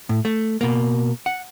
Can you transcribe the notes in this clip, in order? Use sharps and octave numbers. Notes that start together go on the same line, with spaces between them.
A2
A3
B2 A#3
F#5